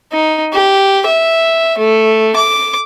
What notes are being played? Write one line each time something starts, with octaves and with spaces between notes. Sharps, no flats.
D#4
G4
E5
A3
D6